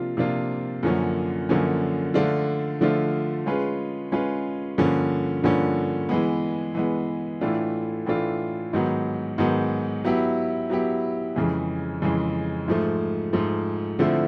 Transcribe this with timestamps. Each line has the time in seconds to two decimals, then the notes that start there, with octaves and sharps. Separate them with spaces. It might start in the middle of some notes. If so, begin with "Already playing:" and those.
Already playing: C3 F3 A#3 D4 F4
0.17 C3 F3 A#3 D4 F4
0.83 F#2 D3 F3 A#3 C#4
1.49 F#2 D3 F3 A#3 C#4
2.14 D3 F3 A3 D4 F4
2.81 D3 F3 A3 D4 F4
3.46 G#3 C#4 F4 G#4 B4
4.12 G#3 C#4 F4 G#4 B4
4.78 G2 D3 F3 A#3 C#4
5.44 G2 D3 F3 A#3 C#4
6.09 E3 G#3 B3
6.75 E3 G#3 B3
7.41 A2 E3 A3 D4 F4
8.06 A2 E3 A3 D4 F4
8.73 G#2 D#3 F#3 B3
9.38 G#2 D#3 F#3 B3
10.05 F#3 B3 E4 G4
10.70 F#3 B3 E4 G4
11.36 F2 C#3 E3 G#3
12.02 F2 C#3 E3 G#3
12.68 G#2 F3 A3
13.33 G#2 F3 A3
13.99 D3 F3 A3 C4 E4